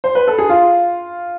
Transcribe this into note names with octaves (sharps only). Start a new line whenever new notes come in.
C5
B4
A4
G#4
F4